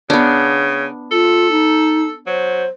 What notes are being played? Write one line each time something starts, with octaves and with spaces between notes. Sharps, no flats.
C#3 B3 D4
F4 A4
D#4
F#3 C5